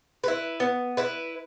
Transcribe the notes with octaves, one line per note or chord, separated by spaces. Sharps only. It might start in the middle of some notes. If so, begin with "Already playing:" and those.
E4 B4
B3
E4 B4